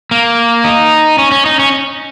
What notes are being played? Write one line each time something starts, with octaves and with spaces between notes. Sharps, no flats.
A#3
D#4
C#4
C#4
D#4
C#4